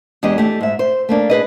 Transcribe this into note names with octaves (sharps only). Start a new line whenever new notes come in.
E2 G#3 D4 G4 D#5
A3 G4
G#2 E5
C5
A3 A#3 D4
G#4 B4 D#5